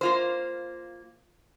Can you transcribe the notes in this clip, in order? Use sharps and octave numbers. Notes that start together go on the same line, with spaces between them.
A#3 F4 C5